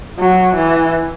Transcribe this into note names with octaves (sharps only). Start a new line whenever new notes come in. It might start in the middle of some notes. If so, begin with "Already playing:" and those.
F#3
E3